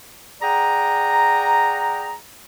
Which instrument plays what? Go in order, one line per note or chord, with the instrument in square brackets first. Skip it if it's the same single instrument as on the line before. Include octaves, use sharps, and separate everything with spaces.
[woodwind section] G#4 D5 F#5 G5 A#5